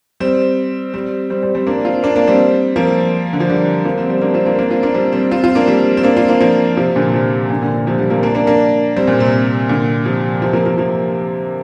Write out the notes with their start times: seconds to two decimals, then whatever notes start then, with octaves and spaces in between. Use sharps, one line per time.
0.20 G3 C4
0.93 G3 C4
1.30 G3 C4
1.43 G3 C4
1.55 G3 C4
1.67 A#3 D4
1.85 C4 F4
2.03 A#3 D4
2.16 A#3 D4
2.27 G3 C4
2.76 F3 A#3
3.33 D3
3.40 F3
3.50 D3 G3
3.85 F3 A#3
3.97 G3 C4
4.10 G3 C4
4.21 A#3 D4
4.34 C4 F4
4.46 A#3 D4
4.58 A#3 D4
4.71 C4 F4
4.83 A#3 D4
4.94 G3 C4
5.12 G3 C4
5.31 C4 F4
5.43 C4 F4
5.55 A#3 D4
5.67 G3 C4
5.97 C4
6.04 A#3 D4
6.16 C4 F4
6.28 A#3 D4
6.41 F3 A#3
6.77 C3 F3
6.96 A#2 D3
7.14 C3 F3
7.50 A#2 D3
7.62 A#2 D3
7.74 A#2 D3
7.86 C3 F3
7.98 D3 G3
8.10 F3 A#3
8.23 A#3 D4
8.35 A#3 D4
8.47 A#3 D4
8.96 G3 C4
9.07 A#2
9.20 C3
9.32 C3
9.69 A#2 D3
10.05 C3 F3
10.42 C3 F3
10.53 F3 A#3
10.66 F3 A#3
10.78 F3 A#3